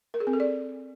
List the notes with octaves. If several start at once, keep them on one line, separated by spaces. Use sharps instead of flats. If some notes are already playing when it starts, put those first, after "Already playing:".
A#4
G#4
C4
A4
D5